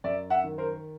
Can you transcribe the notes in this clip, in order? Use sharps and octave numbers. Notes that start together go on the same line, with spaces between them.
F#2 D5 E5
E5 F#5
D#3
A#4 C5